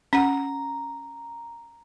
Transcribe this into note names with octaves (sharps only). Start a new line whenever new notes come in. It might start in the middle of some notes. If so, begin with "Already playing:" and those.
C#4 F#5 A#5